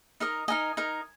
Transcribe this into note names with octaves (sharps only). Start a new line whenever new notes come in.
D#4 A#4 D#5
D#4 A#4 D#5 G#5
D#4 A#4 D#5